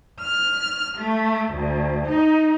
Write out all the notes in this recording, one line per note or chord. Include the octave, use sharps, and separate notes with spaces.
F6
A3
D2
D#4